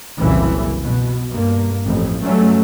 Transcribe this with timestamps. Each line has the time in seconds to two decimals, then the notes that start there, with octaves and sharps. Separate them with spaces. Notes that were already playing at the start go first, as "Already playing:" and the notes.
0.18 F#1 C2 A#2 C#3 E3
0.80 B2
1.30 G2 A#3
1.84 A1 F2
2.21 G2 F#3 A3 C#4